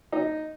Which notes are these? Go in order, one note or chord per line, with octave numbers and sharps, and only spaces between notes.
D#4